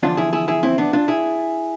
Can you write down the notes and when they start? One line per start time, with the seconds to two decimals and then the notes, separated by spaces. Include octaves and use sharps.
0.03 E2 D3 F3 D4 F4
0.17 E4 G#4
0.33 E4 G#4
0.48 E4 G#4
0.63 C4 E4
0.78 B3 D4
0.93 D4 F4
1.08 E4 G#4